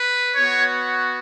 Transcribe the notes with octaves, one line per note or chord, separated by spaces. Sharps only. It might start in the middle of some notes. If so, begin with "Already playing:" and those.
Already playing: B4
B3 F#4 C#5